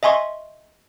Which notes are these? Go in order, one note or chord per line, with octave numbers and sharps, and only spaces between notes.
D#5 E5 G#5 C6 C#6